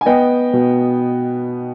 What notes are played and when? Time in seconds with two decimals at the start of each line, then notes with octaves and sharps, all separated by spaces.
0.01 G#5
0.06 B3 D#5 G5
0.53 B2